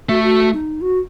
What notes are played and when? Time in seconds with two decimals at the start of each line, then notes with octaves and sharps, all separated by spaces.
0.09 A3 F#4
0.23 F#4
0.53 D#4
0.81 F#4